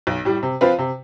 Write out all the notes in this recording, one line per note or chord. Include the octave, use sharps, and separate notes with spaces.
B1
A2 G3
C3
F3 C4 F4 B4
C3